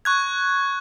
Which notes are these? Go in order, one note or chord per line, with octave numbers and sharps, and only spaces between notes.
C#6 F#6 G#6